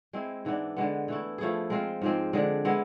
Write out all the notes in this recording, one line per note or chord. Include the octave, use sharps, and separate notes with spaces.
G#3 C4 E4
G#2 E3 B3 D4
D3 G#3 B3
E3 A3 E4
F3 A3 E4 G#4
G#3 C4 F4
G#2 F3 G#3 C4
D3 G#3 D4 G#4
G#3 B3 E4